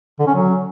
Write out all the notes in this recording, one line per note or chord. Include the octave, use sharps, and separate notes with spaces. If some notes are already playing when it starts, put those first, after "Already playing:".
D3
C#4
F#3